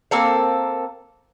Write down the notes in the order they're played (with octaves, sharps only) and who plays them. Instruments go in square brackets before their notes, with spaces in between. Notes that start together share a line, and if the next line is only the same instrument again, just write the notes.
[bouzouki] A#3 C4 A4 F5